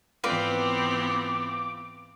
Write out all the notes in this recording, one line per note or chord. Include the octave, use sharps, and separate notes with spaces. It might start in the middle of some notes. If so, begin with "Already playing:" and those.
G#2 E3 B3 C4 F4 B4 D5 D6